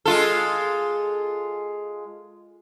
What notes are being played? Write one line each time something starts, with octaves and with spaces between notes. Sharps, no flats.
G#3 F4 A4